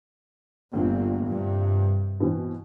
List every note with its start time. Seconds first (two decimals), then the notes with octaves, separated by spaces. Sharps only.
0.73 G1 D2 A#2 C4
1.28 G2 C3
2.20 B2 E3 C4